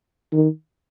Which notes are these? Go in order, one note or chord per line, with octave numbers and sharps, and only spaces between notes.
D#3